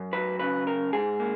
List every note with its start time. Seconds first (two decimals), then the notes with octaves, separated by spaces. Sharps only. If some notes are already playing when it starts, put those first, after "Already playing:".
Already playing: F#2
0.13 F#3 B4
0.40 C#3 B4
0.66 F#2 A#4
0.93 G#2 G#4
1.20 A#3